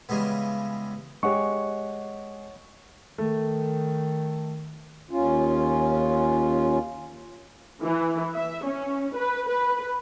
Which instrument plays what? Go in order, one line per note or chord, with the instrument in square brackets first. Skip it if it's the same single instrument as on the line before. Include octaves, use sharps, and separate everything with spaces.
[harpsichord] C#3 E3 G3 G#3 B3
[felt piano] G#3 G4 [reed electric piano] C#5 F#5 C#6
[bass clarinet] D#3 [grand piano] A3
[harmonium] D#2 C#4 F4
[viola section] E3
E5
C#4
B4
B4